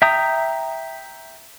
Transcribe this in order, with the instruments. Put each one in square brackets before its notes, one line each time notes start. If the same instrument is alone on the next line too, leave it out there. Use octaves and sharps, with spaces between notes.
[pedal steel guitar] E5 G5 A#5 D#6